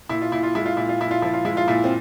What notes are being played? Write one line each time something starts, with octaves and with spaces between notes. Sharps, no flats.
A#2 E4
F4
A#2 E4
F4
G#3 E4
F4
A#2 E4
F4
A#2 E4
F4
F3 E4
F4
G#3 E4
F4
A#2 E4
C4